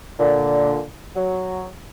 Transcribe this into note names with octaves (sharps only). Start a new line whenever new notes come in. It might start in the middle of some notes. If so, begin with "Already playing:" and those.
A#2 D3
F#3